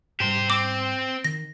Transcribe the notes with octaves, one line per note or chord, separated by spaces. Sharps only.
G#2 G3 G4 C5
C4 D6
D#3 A#6